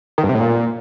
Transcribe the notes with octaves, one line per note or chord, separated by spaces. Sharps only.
D#3
G2
C3
A2
A#2